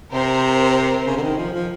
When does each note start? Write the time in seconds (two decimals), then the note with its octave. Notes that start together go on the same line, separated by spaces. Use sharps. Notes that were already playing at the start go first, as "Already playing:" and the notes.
0.12 C3 A#4 C5
1.06 C#3
1.17 D3
1.22 D#3
1.37 F3
1.53 F3